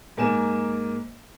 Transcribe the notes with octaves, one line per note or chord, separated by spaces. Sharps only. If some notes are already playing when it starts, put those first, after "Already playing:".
G#2 A#3 G#5 E7